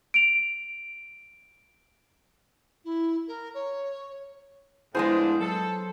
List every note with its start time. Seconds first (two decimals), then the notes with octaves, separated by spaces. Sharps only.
0.14 D7 F7
2.85 E4
3.28 A#4
3.54 C#5
4.95 A2 F3 G#3 B3 D4 E4 G#4 C5
5.41 F#3 A4